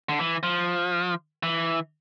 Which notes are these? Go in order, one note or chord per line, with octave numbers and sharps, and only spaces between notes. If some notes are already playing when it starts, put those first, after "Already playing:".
D3
E3
F3
E3